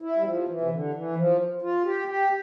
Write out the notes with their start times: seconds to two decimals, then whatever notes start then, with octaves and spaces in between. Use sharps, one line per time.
0.02 E4
0.17 G3
0.25 F3
0.48 E3
0.61 C3
0.71 D3
0.94 E3
1.16 F3
1.62 F4
1.86 G4
2.08 G4